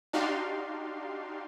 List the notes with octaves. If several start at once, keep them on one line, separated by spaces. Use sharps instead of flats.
D4 D#4 F#4 G4 F5 C6